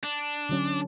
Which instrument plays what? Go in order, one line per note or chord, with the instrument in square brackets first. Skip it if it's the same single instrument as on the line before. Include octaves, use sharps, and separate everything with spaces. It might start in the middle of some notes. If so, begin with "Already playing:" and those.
[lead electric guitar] D4
[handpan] D3 F#3 C#4